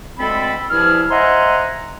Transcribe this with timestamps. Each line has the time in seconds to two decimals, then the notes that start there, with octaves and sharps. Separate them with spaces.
0.19 D2 G#3 C4 A4 B5
0.70 G2 F3 E4 G#4 F6
1.10 C5 D#5 E5 F#5 G#5 A#5